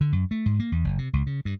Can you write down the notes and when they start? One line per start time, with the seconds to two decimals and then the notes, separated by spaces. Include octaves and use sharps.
0.01 D3
0.12 F#2
0.31 A3
0.46 G#2
0.60 A#3
0.72 E2
0.84 F#1
0.98 C3
1.13 C#2
1.27 C#3
1.45 G2